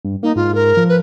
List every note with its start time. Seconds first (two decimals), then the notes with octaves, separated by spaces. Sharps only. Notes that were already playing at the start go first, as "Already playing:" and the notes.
0.05 G2
0.23 A#3 D#4
0.36 G#2 F4
0.55 A#4
0.77 F3
0.89 B4